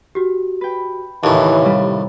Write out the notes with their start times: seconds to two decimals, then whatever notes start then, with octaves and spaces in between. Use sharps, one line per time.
0.15 F#4 G4
0.61 B4 G5
1.24 D#2 A2 C#3 E3 A5
1.61 C3 G3 F5